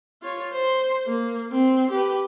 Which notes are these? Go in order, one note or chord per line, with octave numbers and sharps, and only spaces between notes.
F4 C#5
C5
A#3
C4
G4 B4